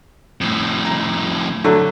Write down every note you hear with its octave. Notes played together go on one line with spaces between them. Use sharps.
F2 A2
A#5
D3 F#3 A3